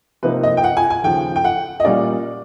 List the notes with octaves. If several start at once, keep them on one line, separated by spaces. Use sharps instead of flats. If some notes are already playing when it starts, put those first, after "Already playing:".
C3 F3 A#3 D#4 B4
D#5
G5
F#5
G#5
G#5
D#2 C#3 F3 G5
G5
F#5
D#5
A#2 G3 A#3 C#4 D5